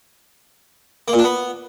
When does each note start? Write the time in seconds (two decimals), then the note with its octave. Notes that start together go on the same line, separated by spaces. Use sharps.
1.08 A#3
1.13 A#2
1.19 D4
1.24 B3